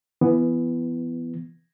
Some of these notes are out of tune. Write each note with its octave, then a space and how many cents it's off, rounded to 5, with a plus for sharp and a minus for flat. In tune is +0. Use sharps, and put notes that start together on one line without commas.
E3 +20 B3 +0